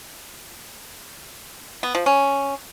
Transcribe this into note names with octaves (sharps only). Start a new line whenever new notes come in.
B3
F3
C#4